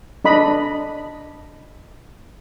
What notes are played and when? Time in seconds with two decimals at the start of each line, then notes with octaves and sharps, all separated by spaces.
0.25 D4 D#5 B5